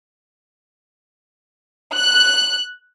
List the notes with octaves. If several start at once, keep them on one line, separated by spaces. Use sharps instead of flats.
F#6